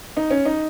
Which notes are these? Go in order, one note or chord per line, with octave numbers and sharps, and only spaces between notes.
D#4
C#4
D#4